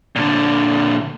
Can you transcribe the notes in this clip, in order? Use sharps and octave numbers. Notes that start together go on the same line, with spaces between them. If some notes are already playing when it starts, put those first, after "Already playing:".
A#2 D3